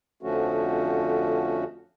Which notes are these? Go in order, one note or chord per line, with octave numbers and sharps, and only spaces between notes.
F2 D3 F3 A3 C#4 F#4